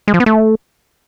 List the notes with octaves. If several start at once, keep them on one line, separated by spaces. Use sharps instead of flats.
G#3
F3
B3
A3